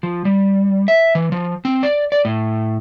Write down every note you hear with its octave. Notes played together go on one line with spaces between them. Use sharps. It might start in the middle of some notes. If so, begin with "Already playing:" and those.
F3
G3
E5
E3
F3
C4
D5
D5
A2